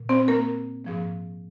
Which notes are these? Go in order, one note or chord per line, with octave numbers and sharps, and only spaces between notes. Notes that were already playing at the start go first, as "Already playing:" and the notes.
Already playing: A#2
C4 C5
A#3 A#4
G#2 F3 A#3